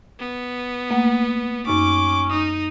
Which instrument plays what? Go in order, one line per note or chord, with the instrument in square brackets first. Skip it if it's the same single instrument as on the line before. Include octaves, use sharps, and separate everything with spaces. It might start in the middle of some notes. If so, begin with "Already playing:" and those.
[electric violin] B3
[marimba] A3 A#3 F#5
[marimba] F#2 D#4 [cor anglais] C#4 [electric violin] D6
[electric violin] D#4 [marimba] D#6